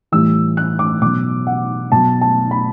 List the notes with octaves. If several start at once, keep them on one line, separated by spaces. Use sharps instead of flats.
A2 E3 G3 E6
F#6
D6
B2 F#3 D6
F#5
B2 F#3 A5
A5
B5